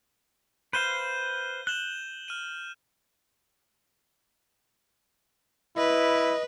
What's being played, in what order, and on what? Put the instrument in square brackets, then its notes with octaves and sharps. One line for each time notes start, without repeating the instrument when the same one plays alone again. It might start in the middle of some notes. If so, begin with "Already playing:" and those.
[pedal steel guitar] B4 C5 F5 [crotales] G6 D#7 G7
[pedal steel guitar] F#6 [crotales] E7 F#7 G7
[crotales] F6 D#7
[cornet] E4 [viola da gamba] B4 [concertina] D#5